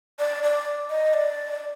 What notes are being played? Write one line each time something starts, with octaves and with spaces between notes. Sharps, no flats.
D5
D5
D#5
D5